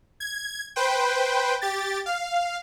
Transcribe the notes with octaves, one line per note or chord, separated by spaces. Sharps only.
G#6
B4 C5 G5
G4 A6
F5